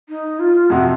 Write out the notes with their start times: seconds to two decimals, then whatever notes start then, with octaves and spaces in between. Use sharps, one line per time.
0.09 D#4
0.39 F4
0.70 F2 C3 F3 F#4